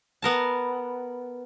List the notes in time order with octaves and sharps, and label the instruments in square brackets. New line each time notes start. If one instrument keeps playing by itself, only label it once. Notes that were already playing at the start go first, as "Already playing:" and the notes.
[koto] B3 A#4 A5